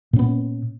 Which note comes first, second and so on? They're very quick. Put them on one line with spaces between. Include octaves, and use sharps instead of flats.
A#2 C#4 B3